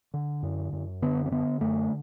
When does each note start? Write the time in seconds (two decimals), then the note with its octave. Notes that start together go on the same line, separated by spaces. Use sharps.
0.14 D3
0.43 F#2
0.73 F#2
1.02 D3 B3
1.26 C4
1.31 D3 B3
1.61 F#2 A3